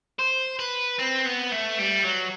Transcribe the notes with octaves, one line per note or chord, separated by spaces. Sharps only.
C5
B4
C4
B3
A3
G3
F#3